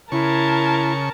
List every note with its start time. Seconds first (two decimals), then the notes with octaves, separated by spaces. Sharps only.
0.12 C#3 E4 A#4 A5 C#6